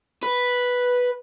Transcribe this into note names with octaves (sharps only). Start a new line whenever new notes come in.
B4